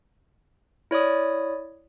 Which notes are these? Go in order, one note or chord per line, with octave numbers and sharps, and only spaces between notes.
E4 C#5 D5 D#6